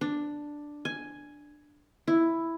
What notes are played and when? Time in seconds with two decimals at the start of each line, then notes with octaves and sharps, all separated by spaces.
0.01 D4
0.85 G#5
2.08 E4